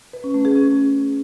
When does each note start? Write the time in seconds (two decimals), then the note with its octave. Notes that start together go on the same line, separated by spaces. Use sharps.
0.13 B4
0.24 C#4
0.34 A3
0.45 G#4
0.55 C#4